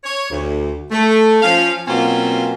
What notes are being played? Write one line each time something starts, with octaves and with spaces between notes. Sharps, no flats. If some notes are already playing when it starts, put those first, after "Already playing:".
C#5
D2
A3
F3 C#4 F5
B2 F#3 A#3 C4 C#4 F4